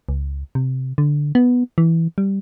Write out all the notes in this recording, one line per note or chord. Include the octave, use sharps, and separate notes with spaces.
C#2
C3
D3
B3
E3
G3